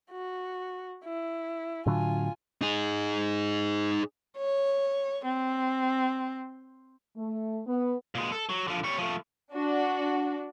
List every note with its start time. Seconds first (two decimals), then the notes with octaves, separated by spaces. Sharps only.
0.11 F#4
1.05 E4
1.86 A2 D3 F#3 F4 G#5
2.61 D#4 G#4
4.37 C#5
5.26 C4
7.17 A3
7.67 B3
8.15 A#2 G#3
8.32 A4
8.49 F#3
8.67 D3 F3
8.84 G3 C#5
8.98 F3 A3
9.51 D4 F#4